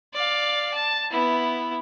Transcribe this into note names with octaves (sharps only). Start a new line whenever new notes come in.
D5 F5
A5
B3 E4